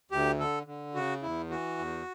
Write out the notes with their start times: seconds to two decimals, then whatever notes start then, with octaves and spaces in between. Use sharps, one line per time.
0.11 D2 G4
0.39 D3 A4
0.67 D3
0.94 C#3 F#4
1.22 E2 E4
1.50 E3 F#4
1.78 E2